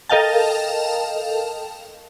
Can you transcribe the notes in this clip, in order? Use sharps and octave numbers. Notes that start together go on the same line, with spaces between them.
A4 A#4 D#5 F5 G5 A5